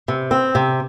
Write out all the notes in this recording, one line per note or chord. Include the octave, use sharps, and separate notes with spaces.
C3
C4
C3